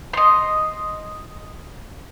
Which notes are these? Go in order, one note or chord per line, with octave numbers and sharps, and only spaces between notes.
D#5 C6